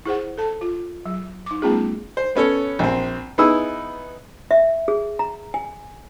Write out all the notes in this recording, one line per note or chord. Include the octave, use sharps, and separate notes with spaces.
E4 G#4 C5 F#5
A4 A5
F4
F#3
D#4 D6
G3 A3 B3 C#4 F4 G#4
C5
B3 C#4 A4 C#5
A#1 C4
B3 D#4 E4 G#4 E6
E5
G#4
A#5
G#5